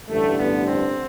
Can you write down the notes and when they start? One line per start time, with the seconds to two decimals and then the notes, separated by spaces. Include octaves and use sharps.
0.09 A1 G2 D3 A3
0.38 B3
0.66 C4